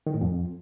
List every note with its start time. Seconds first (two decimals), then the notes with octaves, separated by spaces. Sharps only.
0.07 D#3
0.14 A2
0.21 F2